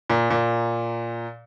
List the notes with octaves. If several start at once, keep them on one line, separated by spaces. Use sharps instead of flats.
A#2
A#2